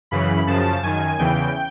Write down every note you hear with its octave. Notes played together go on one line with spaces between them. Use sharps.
F#2 C#3 E3 B5
F#2 C#3 F3 A5
F#2 D#3 G#5
E2 C#3 E3 G5